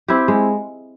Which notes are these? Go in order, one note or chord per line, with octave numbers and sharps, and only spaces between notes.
C4 E4 G4
G#3